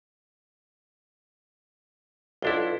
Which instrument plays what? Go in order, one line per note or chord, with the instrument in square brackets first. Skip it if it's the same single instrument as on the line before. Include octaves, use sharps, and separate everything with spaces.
[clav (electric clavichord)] B1 D4 E4 [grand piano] F4 A4 G7